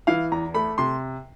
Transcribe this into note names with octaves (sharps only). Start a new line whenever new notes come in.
E3 F5
E2 A#5
A3 B5
C3 C6